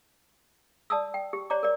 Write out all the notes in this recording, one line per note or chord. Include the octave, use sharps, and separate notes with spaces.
D5 A5 D#6 E6
G5
G4
C#5 D5 A#5 D6
A#4 D5